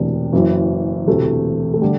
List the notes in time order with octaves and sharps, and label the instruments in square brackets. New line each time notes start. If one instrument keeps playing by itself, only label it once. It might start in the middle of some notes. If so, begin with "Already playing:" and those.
Already playing: [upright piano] E1 D2 C3 E3 D4
F#1 F#2 E3
E1 D2 C3 E3 A3
A3
D3 G3